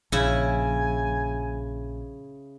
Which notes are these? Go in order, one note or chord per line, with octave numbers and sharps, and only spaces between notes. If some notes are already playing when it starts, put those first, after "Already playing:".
A#1 C#3 E4 G#5